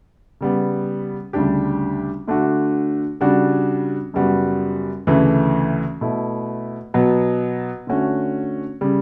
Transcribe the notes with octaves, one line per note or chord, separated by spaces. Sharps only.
C#3 G3 B3
D2 C#3 G3 D4 G4
D3 A3 D4 F#4
C#3 G3 D4 F#4
F#2 C#3 G3 B3 F#4
D2 C#3 E3 A3
B2 A3 E4
B2 F#3 B3
D3 A3 C#4 F#4
C#3 G3